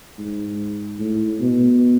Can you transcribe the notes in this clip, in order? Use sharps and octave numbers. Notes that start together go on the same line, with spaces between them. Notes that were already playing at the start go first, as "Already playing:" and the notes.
G#2
A2
B2